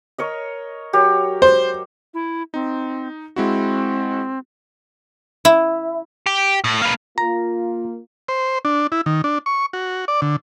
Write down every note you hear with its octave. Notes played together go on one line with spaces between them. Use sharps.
A#4 C#5 D#5
F#3 G4 A#4
C5
E4
C4 D#4
G#3 C4 E4 F#4
E4
G4
A2
A#3 B4
A#3 F4 A#5
C5
D4
E4
D#3
D4
C#6
F#4
D5
D3